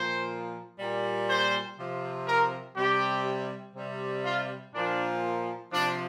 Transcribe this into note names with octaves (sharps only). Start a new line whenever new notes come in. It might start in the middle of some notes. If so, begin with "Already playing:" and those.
Already playing: A#2 F3 C5
A#2 G3
C5
C3 F3
A#4
C3 G3 G4
C3 G3
F4
A#2 F3 D4
C3 F3 D4